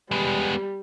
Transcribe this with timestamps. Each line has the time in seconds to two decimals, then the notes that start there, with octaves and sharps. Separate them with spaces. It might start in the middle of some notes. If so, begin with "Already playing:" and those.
0.11 G3 G#3 B3